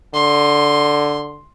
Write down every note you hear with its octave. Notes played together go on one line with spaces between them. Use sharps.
D3 C6